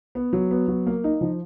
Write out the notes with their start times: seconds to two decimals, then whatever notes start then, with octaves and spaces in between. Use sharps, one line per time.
0.15 B3
0.33 F#3
0.51 B3
0.68 F#3
0.87 A#3
1.04 D#4
1.21 F3